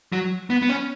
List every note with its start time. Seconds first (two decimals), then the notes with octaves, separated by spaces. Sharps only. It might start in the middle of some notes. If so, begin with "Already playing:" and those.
0.12 F#3
0.50 B3
0.62 B3
0.69 C#4